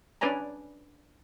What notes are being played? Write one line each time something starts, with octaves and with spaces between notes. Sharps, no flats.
C#4 D4 B4 D5 G#5 A#5